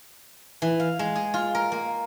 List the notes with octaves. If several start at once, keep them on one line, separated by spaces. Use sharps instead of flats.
E3
F5
G#3
G#4
F4
A#4
A#3